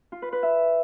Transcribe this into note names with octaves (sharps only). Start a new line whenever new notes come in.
F4
B4
B4
E5